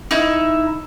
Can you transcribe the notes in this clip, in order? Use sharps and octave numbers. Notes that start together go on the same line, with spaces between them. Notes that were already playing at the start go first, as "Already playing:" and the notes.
D#4 E4 E5